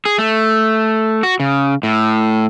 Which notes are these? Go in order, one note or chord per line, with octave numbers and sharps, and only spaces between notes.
G#4
A3
F#4
C#3
A2